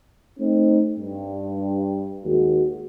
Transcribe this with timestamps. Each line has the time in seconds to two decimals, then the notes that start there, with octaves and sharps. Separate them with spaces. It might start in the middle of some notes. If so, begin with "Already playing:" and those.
0.40 A3 C4 D#4
0.98 G2
2.25 D#2 G#3 F#4